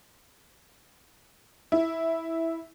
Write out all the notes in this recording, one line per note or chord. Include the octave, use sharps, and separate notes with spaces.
E4